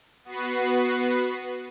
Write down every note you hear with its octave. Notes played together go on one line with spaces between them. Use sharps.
B3 F#4 B4 C7